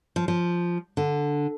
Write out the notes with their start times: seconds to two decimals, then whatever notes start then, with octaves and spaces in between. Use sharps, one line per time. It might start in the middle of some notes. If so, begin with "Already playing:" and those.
0.16 F3
0.28 F3
0.97 D3